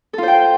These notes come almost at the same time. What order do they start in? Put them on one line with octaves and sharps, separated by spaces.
A4 F4 C5 G5